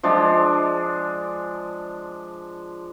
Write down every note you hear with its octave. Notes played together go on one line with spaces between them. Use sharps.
F3 G#3 D4